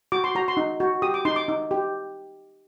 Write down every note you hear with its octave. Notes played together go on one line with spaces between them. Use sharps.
F#4 D6
C6
F#4 A#5
C6
D#4
F#4
G4 D#6
D6
D#4 C6
D6
D#4
G4